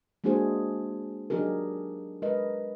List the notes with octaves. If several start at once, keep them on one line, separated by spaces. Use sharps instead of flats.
G#3 A#3 D4 F#4 G#4 C5
F#3 D4 D#4 G4 G#4 A#4
G#3 A#4 B4 D#5